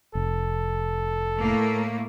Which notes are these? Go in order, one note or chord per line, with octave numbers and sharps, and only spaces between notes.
F1 A4
A2 A3 A#3